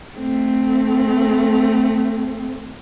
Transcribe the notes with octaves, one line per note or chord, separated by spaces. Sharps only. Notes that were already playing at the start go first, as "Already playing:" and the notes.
A3 C4